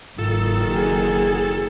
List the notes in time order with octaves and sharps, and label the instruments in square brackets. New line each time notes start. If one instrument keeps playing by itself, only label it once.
[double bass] F#1 D#3 [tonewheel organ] G#2 F4 E6 [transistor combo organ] A4
[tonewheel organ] F#4 [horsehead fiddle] G#4